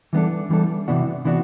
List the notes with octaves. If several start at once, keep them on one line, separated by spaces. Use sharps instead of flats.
E3 G3 B3 D4 A4
E3 G3 B3 D4 A4
C3 E3 B3 D4 F#4
C3 E3 B3 D4 F#4